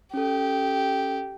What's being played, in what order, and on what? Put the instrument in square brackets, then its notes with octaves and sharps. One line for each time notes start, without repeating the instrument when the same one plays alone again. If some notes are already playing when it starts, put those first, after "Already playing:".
[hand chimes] C#4 A4 [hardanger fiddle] G4